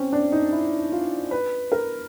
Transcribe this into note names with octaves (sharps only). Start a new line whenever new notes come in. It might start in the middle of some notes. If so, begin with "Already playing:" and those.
Already playing: C4 C#4
D4
D#4
E4
F4
B4
A#4